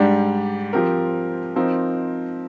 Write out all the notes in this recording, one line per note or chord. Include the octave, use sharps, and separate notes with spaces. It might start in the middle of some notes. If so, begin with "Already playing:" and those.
Already playing: G#2 G3 D4 G4
F3 C4 G4 A#4
F3 C4 D#4 A#4